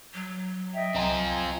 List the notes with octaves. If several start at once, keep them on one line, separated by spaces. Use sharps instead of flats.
F#3
D#5 E5 G5
C2 C4 F4 D#5 G#5 A#5